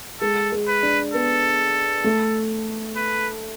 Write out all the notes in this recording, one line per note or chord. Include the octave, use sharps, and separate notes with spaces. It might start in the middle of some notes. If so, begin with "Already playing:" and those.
G#3 A4
G#3
B4
D4
B3 A4
A3
B4